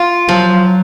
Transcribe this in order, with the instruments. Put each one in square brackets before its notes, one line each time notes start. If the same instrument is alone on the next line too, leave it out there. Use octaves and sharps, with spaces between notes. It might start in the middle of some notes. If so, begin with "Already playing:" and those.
Already playing: [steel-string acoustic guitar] F4
[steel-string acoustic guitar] F3 [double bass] F#3